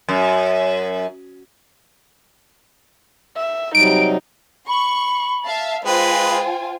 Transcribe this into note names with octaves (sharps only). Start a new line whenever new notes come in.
F#2
E5
C3 F#3 G3 D#4 D7
B5 C#6
E5 F5 A5
G#3 F4 B4 C5 G5 G#5